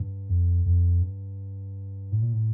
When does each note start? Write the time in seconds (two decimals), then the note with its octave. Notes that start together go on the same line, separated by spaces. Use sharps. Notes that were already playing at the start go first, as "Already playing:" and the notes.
Already playing: G2
0.29 F2
0.66 F2
1.02 G2
2.12 A2
2.22 A#2
2.33 A2